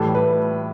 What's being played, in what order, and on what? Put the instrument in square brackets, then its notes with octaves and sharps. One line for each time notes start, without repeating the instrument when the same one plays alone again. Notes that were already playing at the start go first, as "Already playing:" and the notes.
Already playing: [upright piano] A2 E3 G3 A4
B4